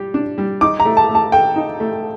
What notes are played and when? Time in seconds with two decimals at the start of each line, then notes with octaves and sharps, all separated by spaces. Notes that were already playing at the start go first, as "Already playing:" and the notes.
Already playing: G3 G4
0.14 D4
0.38 G3
0.61 D#4 D6
0.80 A#5
0.85 A3
0.97 A5
1.10 A3
1.15 A5
1.32 A4 G5
1.56 D#4
1.80 A3